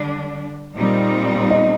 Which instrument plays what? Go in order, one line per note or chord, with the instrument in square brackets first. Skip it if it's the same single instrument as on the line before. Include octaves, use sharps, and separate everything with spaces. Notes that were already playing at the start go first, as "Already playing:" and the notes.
Already playing: [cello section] D3 G3 D4
A#2 G3 C4 D#4
[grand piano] D#5